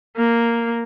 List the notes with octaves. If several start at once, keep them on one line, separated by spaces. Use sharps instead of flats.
A#3